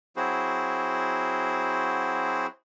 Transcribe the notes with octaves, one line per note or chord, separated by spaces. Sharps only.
F#3 C4 E4 F#4 G#4 C5